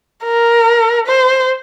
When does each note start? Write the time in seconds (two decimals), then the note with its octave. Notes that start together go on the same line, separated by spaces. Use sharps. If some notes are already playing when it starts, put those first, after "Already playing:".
0.25 A#4
1.07 C5